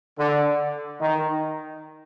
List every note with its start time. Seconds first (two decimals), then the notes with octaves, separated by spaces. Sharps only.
0.19 D3
1.01 D#3